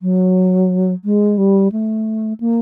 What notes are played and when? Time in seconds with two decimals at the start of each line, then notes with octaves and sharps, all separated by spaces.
0.02 F#3
1.05 G#3
1.38 G3
1.72 A3
2.40 A#3